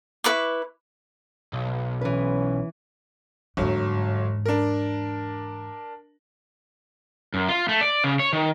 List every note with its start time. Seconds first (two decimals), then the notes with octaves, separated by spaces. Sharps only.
0.24 E4 B4 C#6 D6
1.53 B1
2.01 E3 C#4 B4
3.57 G1 E2 G#2 F#3
4.46 D4 A#4
7.34 F#2
7.48 F4
7.69 A3
7.81 D5
8.04 C#3
8.19 C#5
8.33 D#3